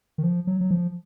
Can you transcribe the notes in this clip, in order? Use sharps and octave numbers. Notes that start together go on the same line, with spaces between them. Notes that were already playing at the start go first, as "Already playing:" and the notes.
D#3
F3
F#3
F#3
F3